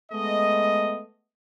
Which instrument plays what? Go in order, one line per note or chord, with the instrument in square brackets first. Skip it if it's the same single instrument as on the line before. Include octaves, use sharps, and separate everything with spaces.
[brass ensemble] G#3 A3 B3 D#5